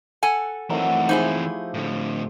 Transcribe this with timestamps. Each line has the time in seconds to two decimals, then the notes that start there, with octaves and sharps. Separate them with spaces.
0.23 A4 F#5 G#5
0.70 D#3 E3 F#3 A3 C4
1.09 F3 D#4 E4 G4 G#4
1.74 A2 D3